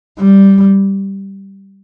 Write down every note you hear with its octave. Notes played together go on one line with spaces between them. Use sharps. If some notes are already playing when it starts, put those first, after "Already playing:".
G3